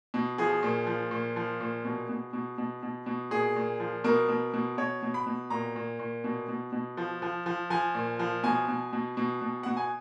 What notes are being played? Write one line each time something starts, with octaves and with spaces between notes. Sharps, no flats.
B2
F3 G#4
A#2
F3
A#2
F3
A#2
B2
B2
B2
B2
B2
B2
A#2 G#4
A#2
F3
B2 A#4
B2
B2
B2 C#5
B2
B5
B2
A#2 A#5
A#2
A#2
B2
B2
B2
F3
F3
F3
F3 G#5
A#2
F3
B2 G#5
B2
B2
B2
B2
B2 F#5
G#5